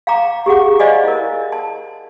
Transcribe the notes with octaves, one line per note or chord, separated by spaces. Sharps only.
F5 G5 A#5 D6
G4 G#4 F#5 D6
C5 D5 D#5 F5 G#5 D6
E4 A#4
A5